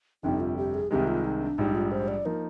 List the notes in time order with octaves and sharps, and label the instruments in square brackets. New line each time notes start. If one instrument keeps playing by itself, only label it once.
[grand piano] G1 F2 C3 G3 [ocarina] D#4
[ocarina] F4
G4
G#4
[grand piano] C2 C3 D#3 G#3 [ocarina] G4
[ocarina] F4
D#4
D4
[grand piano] A#1 G#2 G3 [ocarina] D#4
[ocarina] F4
C5
D5
[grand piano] F3 A#3 D#4 [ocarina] A#4